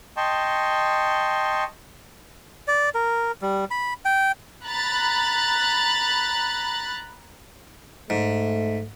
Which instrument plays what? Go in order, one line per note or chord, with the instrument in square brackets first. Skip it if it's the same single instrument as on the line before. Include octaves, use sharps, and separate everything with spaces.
[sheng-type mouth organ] D#5 G5 A5 C6 C#6
[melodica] D5
A#4
G3
B5
G5
[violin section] A#5 B5 F#6 A6
[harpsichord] G#2 [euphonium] A3